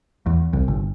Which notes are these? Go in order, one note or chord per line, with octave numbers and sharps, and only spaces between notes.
E2
C2
G1